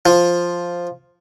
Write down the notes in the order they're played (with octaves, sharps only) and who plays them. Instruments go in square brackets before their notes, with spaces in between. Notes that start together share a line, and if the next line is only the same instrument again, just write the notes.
[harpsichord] F3